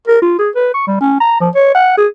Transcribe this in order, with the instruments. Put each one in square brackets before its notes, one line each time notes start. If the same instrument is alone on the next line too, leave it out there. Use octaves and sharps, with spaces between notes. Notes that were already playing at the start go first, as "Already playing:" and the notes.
[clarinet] A#4
F4
G#4
B4
C#6
G3
C#4
A#5
F3
C#5
F#5
G#4